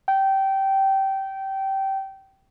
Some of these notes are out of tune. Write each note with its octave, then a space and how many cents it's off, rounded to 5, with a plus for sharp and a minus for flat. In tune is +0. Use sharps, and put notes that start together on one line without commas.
G5 -20